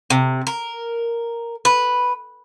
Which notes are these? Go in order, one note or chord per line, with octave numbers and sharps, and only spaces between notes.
C3
A#4
B4